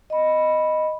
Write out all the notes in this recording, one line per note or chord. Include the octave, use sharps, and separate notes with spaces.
D#5 B5